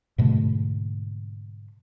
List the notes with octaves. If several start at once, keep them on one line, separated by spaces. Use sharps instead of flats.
G#2 B2 D3 A3